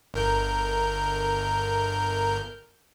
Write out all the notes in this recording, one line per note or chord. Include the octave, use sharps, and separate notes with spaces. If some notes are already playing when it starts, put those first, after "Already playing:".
G1 A#4 G6